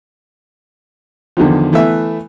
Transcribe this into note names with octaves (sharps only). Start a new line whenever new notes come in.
E2 D3 D#3 F3
E3 A3 B3 E5